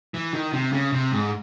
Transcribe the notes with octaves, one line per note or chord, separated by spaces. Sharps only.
E3
D#3
C3
C#3
C3
G#2